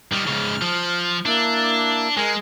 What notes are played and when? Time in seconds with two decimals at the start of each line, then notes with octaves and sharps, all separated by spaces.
0.13 D#3 G3 F6
0.27 G#2 C#3
0.62 F3
1.26 A#3 D4 E4
2.17 G#3 A#4 G#5